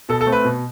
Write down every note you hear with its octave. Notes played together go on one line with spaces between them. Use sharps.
B2 A4
A4
A3 C4
B4
B2